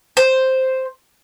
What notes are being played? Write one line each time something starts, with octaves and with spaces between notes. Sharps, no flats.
C5